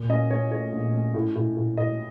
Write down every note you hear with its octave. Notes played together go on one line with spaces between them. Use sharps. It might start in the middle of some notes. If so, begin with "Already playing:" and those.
Already playing: A#2
C#4 D#5
C#4 C#5
A3 C#5
A#1
C#4
A2
A2
A2
A2 D#5